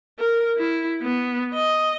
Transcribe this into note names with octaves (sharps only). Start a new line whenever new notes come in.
A#4
E4
B3
D#5